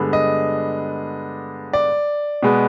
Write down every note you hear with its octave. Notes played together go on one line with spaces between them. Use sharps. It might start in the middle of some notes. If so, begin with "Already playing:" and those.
Already playing: G2 D3 G#3 B3
D#5
D5
B2 G#3 B3